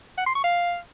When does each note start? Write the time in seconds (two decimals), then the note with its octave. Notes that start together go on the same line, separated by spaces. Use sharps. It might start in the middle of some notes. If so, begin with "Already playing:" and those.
0.18 F#5
0.27 C6
0.35 C#6
0.44 F5